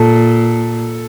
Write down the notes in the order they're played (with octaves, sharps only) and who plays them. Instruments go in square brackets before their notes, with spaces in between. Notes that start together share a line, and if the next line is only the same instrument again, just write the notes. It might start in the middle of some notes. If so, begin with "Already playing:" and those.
Already playing: [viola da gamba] A#2 [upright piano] A4